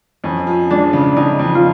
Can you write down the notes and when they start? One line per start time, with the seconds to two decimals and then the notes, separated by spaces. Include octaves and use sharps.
0.24 F2 C#4
0.47 F3
0.70 G#3 D4
0.93 C#3
1.16 F2 D#4
1.39 F2
1.55 F4